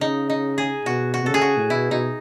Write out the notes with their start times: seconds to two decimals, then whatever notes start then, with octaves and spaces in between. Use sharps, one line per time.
0.01 C#3 D#4
0.30 D#4
0.58 G#4
0.85 B2 F#4
1.14 F#4
1.23 B2
1.26 C#3 A4
1.34 G#4
1.41 F#4
1.57 A2
1.70 B2 E4
1.91 B2 D#4